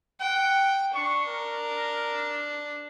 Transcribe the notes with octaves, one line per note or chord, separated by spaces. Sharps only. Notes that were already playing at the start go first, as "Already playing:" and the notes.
F#5 G5
D4 C#6
A#4